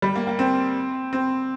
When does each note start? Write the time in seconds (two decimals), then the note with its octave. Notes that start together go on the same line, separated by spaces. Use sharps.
0.02 G3
0.16 A#3
0.27 A#3
0.39 C4
1.13 C4